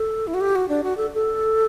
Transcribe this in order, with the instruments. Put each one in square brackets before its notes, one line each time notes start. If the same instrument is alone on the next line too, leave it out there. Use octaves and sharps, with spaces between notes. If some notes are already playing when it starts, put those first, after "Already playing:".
Already playing: [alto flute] A4
E4
F#4
G4
F#4
D4
F#4
A4
A4